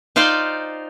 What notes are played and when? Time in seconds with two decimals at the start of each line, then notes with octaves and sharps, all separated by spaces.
0.16 D#4 F4 C5 D5 F5 G5